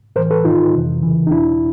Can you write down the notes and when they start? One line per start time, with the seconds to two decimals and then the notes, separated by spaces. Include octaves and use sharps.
0.16 A2 E3 A#4 C5
0.31 A4 B4
0.45 G#2 D#3 D#4 F4
0.73 F2 C3 E3
1.03 E2 C#3 E3
1.27 D#4
1.31 E2 B2 D4 E4